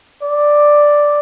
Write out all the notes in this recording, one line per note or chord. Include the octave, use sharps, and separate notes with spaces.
D5